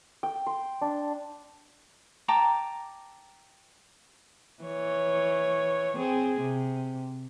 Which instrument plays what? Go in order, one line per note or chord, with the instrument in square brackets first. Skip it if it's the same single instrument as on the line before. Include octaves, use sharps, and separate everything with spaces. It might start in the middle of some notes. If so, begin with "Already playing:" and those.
[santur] G5
C6
D4
[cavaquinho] G5 A5 A#5 D6
[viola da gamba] E3 C#5
C4 G#4
C3